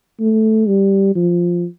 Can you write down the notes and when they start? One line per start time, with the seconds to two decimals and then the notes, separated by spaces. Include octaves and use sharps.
0.20 A3
0.67 G3
1.15 F3